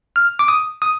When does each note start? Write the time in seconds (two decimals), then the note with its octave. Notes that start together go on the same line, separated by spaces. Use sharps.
0.16 F6
0.39 D6
0.48 D#6
0.82 D#6